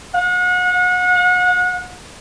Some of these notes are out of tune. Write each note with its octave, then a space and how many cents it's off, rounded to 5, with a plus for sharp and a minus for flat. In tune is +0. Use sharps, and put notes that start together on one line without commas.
F#5 -35